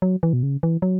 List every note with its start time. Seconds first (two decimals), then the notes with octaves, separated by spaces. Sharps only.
0.02 F#3
0.23 E3
0.33 B2
0.43 C#3
0.63 E3
0.82 F#3